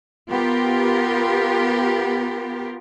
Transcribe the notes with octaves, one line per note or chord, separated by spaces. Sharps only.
B3 F4 G4 A#4